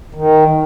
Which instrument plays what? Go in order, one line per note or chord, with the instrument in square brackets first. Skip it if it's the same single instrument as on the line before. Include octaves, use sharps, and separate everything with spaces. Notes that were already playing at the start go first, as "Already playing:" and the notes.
[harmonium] D#3